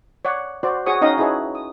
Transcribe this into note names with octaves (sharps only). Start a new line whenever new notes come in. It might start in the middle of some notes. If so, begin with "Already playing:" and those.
C#5 D5 F#5
F#4 C5 D5
F#4 G#4 C#5 C#6 D#6
C#4 D#4 D#5 F5 G5 D#6
E4 F#4 G#4 B4 C#5 A5
D#6